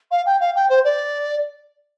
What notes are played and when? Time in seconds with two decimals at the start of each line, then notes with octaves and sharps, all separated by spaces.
0.11 F5
0.26 G5
0.40 F5
0.56 G5
0.70 C5
0.85 D5